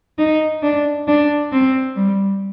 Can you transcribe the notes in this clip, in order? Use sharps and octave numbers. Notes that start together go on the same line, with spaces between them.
D#4
D4
D4
C4
G3